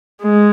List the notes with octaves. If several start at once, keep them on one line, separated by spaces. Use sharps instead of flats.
G#3